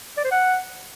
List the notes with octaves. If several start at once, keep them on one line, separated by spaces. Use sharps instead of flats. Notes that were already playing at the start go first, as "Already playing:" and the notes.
D5
C5
F#5